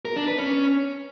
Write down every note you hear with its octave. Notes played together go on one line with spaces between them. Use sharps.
A#4
D4
B4
C#4